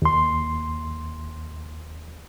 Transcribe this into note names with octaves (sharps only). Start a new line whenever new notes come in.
D#2 C6